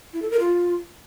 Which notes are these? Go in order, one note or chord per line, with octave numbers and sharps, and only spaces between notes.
E4
A4
A#4
F4